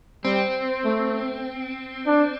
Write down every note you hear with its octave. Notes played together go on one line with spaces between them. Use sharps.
G3 C4
A3
D4